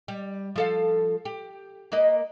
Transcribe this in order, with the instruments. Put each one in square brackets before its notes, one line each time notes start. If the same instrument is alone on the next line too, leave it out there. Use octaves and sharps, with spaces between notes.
[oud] G3
F3 A4 F5
G4
A#3 B4 D#5